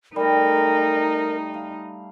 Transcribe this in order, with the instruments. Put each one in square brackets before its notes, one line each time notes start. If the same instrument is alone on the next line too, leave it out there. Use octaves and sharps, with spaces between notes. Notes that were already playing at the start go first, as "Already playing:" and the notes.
[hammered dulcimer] G3 A3 [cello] D#4 [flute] A#4
[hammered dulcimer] F5